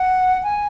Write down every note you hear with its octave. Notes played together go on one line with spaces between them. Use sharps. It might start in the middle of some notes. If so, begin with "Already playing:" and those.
Already playing: F#5
G#5